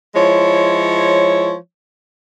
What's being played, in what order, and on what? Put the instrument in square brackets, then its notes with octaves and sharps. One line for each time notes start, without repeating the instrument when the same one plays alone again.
[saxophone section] F3 G#3 E4 C#5